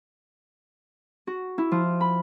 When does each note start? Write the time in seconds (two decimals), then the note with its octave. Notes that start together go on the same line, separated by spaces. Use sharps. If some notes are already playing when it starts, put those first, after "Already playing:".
1.27 F#4
1.58 E4
1.72 F3
2.01 B5